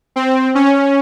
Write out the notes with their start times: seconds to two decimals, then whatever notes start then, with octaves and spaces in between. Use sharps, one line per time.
0.16 C4
0.55 C#4